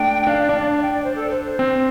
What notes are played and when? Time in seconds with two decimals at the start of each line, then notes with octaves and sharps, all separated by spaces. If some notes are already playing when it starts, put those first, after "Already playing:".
Already playing: A3 D4 G5
0.27 D4 F5
0.42 D5
0.49 D4
0.57 D5
0.71 D5
0.82 G5
0.93 D5
1.04 C5
1.16 A4
1.30 C5
1.44 C5
1.59 C4